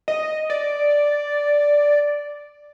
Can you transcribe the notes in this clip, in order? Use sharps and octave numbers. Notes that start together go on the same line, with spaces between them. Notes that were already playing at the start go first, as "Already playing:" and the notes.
D#5
D5